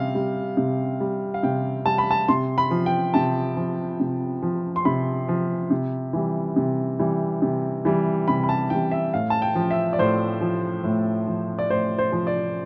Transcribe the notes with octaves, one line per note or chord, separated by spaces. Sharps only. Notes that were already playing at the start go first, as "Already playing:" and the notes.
Already playing: C3 G3 F5
G3
C3
G3
F5
C3 G5
G3 A5
B5
A5
C3 C6
B5
F3
G5
C3 A5
F3
C3
F3
C6
C3 B5
F3
C3
E3 G3
C3
E3 G3
C3
E3 G3
C3 B5
B5
A5
E3 G3 G5
E5
A2 F5
A5
G5
F3
E5
D5
A2 C5
F3
A2
F3
D5
A2 C5
C5
F3
D5